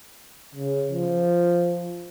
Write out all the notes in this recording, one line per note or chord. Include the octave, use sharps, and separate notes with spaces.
C#3
F3